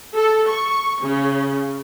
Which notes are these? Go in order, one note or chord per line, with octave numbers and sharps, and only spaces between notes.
A4
C#6
C#3